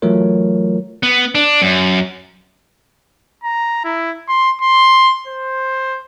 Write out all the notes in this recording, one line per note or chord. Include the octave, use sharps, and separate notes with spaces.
E3 F#3 A3 F4 A#4 C#5
B3
D4
F#2
A#5
E4
C6
C6
C5